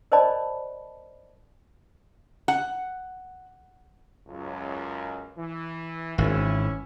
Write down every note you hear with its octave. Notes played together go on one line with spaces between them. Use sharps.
A#4 C5 D5 D#5 A5 B5
F#5
C#2 F#2
E3
G#1 E3 C#4 E4